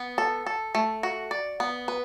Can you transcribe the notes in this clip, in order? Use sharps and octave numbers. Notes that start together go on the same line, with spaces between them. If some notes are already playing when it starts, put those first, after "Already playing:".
Already playing: B3
A4
A4
A3
F#4
D5
B3
B4